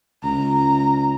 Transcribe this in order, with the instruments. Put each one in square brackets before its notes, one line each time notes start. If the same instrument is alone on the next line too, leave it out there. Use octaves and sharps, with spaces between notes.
[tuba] C#2 [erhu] A#5